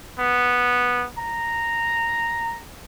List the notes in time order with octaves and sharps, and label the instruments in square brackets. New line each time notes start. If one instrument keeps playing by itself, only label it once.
[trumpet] B3
A#5